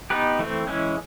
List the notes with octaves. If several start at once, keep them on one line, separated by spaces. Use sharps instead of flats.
B3 D#4 G4 B4
E3 A3 C4
E3 G#3 C#4 E4